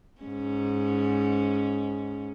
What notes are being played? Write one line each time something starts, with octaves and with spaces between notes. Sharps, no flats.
G#2 C#4